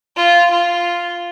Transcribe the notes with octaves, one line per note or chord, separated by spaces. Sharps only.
F4
F4